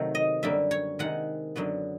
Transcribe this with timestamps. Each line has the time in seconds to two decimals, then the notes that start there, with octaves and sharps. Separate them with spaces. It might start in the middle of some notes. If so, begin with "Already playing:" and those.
Already playing: C3 D#3 F#3 A3
0.15 D#5
0.43 F#2 D3 G3 A#3 E5
0.71 C#5
0.99 C3 D#3 G#3 F#5
1.56 F#2 D3 F#3 B3